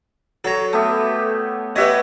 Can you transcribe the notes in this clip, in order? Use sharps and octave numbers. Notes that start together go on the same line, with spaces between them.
F#3 A4 C#5 A#5
A3 B3 G4
B3 G4 C#5 D#5 E5 F#5